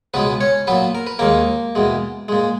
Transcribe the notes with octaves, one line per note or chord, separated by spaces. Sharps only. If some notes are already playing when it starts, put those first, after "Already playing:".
C#2 B2 G#3 B3 B4
C#4 C#5
A#2 F#3 B3 B4
A#4
B4
D#2 D#3 G#3 A#3 A#4
E2 B2 G#3
A#2 G#3